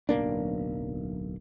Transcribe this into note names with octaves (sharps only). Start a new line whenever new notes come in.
D1 B1 A#3 D4